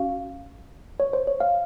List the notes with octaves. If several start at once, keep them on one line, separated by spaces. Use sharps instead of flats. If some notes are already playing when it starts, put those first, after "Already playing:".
Already playing: C#4 F#4 F5
C#5
C5
C#5
F5